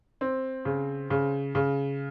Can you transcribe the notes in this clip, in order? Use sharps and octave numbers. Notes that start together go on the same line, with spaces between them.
C4
C#3
C#3
C#3